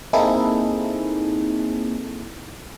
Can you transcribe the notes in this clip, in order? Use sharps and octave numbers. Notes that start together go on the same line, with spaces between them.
A#3 C4 D#4 E4 G#4 A4